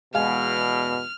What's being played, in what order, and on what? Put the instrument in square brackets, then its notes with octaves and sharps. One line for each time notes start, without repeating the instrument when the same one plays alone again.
[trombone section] E2 B2 [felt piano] G#3 F5 G#5 [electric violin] F6